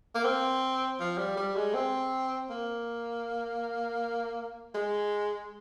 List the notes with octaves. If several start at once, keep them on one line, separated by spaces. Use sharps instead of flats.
A#3
C4
F3
G3
G3
G#3
C4
A#3
G#3